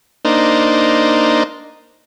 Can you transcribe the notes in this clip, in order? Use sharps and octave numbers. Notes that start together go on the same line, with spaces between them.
A#3 D4 D#4 C5